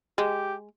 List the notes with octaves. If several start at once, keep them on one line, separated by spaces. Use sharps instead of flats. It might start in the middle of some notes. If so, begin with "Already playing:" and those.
G#3 G4